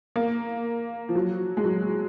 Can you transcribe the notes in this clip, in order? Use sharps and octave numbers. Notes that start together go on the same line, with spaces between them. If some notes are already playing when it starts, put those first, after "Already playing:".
A#3
F3
F#3
G#3
F#3